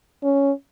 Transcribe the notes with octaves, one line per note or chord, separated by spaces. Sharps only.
C#4